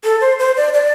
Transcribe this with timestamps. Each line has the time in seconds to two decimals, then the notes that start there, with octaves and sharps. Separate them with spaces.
0.04 A4
0.21 C5
0.39 C5
0.57 D5
0.74 D5